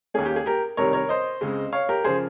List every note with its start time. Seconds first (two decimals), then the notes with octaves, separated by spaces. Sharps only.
0.14 D#2 D#3 A#3 C#4 G#4
0.25 G4
0.36 G#4
0.46 G4 A#4
0.77 C2 C3 D#3 G3 A#4 C#5
0.93 A#4 C#5
1.09 C5 D#5
1.41 C#2 C#3 G#3 C4
1.72 C#5 F5
1.89 G4 A#4
2.04 C#3 F3 G#4 C5